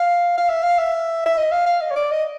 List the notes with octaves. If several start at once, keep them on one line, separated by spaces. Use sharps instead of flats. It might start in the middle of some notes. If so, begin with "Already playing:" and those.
Already playing: F5
F5
E5
F5
E5
E5
D#5
F5
F5
D#5
C#5
D5
D#5